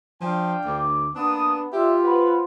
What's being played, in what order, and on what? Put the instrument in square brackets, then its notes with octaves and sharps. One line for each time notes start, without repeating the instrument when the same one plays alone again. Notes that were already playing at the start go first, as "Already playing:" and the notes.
[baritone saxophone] F3 [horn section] D4 F5 G5
[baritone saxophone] D2 [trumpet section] D6
[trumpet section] A#3 D#6 [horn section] B3 [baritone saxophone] D4
[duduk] F4 [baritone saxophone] G4 [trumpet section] D5 E5
[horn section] B4 [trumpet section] C5 F#5